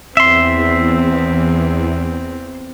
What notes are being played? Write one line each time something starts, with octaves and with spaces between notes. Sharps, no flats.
E2 C4 E5 C6